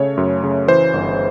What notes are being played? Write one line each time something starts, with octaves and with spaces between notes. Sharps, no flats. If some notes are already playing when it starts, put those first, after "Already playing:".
Already playing: C#3 A3 C#5
F#2
C#3
E3 C5
G1